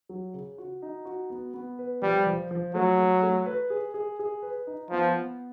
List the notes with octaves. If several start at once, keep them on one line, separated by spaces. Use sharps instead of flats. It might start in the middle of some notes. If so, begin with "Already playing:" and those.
F#3
C#3
F#4
D#4
F#4
B3
B3
B4
F3 G3
F3
F3
F#3 A3
A3
A3
B4
G#4
G#4
G#4
B4
D#4
F3 B3
B3